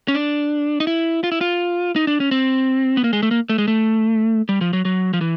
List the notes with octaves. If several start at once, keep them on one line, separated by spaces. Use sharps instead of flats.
C#4
D4
D#4
E4
F4
E4
F4
D#4
D4
C#4
C4
B3
A#3
G#3
A3
A#3
A3
G#3
A3
G3
F3
F#3
F#3
F3
E3